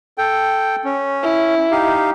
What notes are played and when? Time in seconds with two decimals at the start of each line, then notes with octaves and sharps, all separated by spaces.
0.18 A4 G5
0.84 C#4
1.23 E4
1.71 D#4 G4 F5